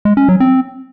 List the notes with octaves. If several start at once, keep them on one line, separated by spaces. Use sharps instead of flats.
G#3
C#4
F#3
C4